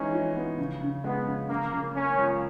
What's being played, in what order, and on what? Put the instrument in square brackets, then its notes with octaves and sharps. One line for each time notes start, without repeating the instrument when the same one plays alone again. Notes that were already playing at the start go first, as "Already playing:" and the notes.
Already playing: [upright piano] E3 G#3 D#4 [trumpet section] C#4
[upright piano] E3
B3
C#3
C#3
[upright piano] G#3 [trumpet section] B3
[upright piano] C#3
[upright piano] C#3 [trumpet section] A#3
[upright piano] C#3
[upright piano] A#3 [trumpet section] C#4
[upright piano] C#2